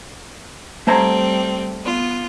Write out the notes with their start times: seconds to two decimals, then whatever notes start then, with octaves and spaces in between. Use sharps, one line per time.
0.87 G3 A3 C4 C5 A#5
1.83 B3 F4